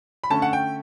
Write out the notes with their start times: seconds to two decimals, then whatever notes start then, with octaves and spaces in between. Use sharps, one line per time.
0.24 B5
0.30 D3 A3 C#4 A5
0.42 F#5
0.53 G5